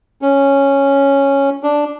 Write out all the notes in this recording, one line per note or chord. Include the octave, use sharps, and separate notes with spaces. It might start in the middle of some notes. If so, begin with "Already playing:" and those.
C#4
D4